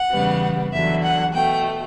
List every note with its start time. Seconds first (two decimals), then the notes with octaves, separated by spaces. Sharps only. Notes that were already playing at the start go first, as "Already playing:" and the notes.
Already playing: F#5
0.11 E2 C#3 G3 B3
0.72 E2 D3 F#3 E5
1.03 F#5
1.34 B2 A3 G5